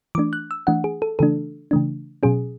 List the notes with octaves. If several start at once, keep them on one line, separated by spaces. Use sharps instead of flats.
E3 A3 D4 D6
F#6
E6
E3 A3 D4 F#5
G#4
A4
C#3 E3 A3 D4 A4
C#3 E3 A3 D4
B2 F#3 C#4 G#4